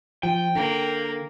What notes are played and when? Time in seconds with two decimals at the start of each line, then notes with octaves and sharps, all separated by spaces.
0.23 F3 G5
0.55 D3 A#3